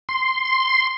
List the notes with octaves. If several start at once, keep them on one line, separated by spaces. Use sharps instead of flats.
C6